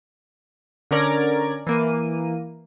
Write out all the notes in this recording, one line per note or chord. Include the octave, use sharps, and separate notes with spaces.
D3 C#4 A#4 D5 A#5 G#6
E3 A#3 D#7